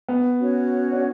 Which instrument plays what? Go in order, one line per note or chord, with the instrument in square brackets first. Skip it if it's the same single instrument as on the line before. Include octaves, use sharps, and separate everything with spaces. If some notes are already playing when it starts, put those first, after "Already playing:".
[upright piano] B3
[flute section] C#4 F#4 C#5
[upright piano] D4